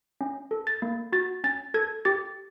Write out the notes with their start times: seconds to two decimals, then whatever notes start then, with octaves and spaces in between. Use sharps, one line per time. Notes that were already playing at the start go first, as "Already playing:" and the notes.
0.21 C#4
0.51 A4
0.67 A6
0.82 A#3
1.12 F#4 A6
1.44 C#4 A6
1.74 A4 G#6
2.05 G4 A6